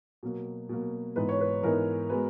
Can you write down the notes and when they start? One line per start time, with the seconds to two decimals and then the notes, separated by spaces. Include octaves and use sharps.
0.23 B2 F#3 A#3
0.69 B2 F#3 A#3
1.16 G#2 E3 B3 D#4 B4
1.29 C#5
1.40 B4
1.63 G#2 E3 B3 D#4 A#4
2.10 G#3 B3 F#4 B4